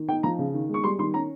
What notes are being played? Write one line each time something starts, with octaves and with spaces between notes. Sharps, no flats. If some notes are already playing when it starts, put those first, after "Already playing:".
Already playing: D#3
D#4 G5
F3 A#5
C#3
D#3
G#3
C#6
G3 C6
D#3 C6
C#4 A#5